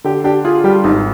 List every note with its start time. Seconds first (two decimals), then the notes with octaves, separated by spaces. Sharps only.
0.04 D3 G4
0.24 D4 G4
0.45 F4 G#4
0.64 G3 G4
0.84 G#1 D#4